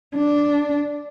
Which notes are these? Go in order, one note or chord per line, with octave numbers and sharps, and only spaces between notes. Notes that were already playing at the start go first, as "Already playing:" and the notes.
D4